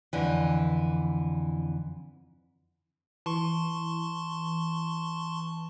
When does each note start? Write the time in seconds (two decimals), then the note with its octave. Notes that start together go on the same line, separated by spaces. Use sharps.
0.13 F2 D3 E3
3.26 E3 A5 C6 C#6